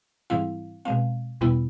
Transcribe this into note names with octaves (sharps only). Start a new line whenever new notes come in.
G#2 E3 G3 C4 E4 F5
B2 G#3 C4 F5
E2 B2 G3 B3 E4